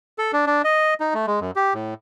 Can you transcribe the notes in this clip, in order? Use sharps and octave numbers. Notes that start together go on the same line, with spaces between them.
A4
D4
D4
D#5
D#4
A3
G#3
F#2
G4
A2